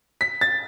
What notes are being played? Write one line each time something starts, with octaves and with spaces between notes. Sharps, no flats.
B6
A6